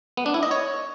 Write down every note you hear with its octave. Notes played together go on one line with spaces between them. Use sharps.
B3
D4
E4
D#5
C#5